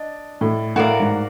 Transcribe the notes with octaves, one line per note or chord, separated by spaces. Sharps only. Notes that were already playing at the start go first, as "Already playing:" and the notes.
Already playing: D4 D#5
A2
A2 F#4 A#4 D5 F5
G#2